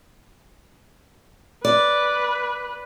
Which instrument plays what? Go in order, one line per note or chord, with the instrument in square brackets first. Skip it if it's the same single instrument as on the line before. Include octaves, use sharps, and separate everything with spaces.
[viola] B4 [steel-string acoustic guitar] D5